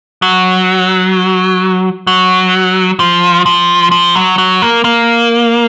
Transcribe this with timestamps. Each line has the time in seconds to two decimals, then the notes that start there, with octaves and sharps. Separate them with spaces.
0.22 F#3
2.07 F#3
3.00 F3
3.46 F3
3.92 F3
4.15 F#3
4.38 F#3
4.62 A#3
4.85 A#3